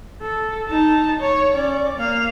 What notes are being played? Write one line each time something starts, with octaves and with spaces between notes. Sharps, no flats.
A4
D#4 A5
C#5
C#4 D5
A#3 F5